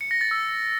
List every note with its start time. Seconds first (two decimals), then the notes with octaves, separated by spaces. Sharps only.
0.01 C#7
0.11 A#6
0.21 A6
0.31 E6